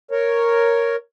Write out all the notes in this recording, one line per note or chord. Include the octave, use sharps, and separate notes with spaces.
A#4 C#5